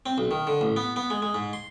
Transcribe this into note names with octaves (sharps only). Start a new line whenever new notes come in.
C4
B1
D#3
D3
A1
B3
B3
G#3
G#3
G#2
C6